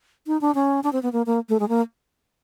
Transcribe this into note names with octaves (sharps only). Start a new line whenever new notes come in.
D#4
D4
C#4
D4
C4
B3
A#3
A#3
A3
G#3
A#3